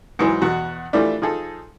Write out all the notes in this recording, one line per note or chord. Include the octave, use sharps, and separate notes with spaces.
G#2 E3 F#3
E2 B2 F#4
E3 F3 G3 A3 D4
F3 D#4 G#4 A4